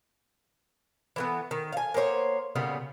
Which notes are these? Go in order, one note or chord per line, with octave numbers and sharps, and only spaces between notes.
E3 A#3 B3
D#3
F5 G#5
A#3 B3 C5 C#5
A#2 C#3 G3 B3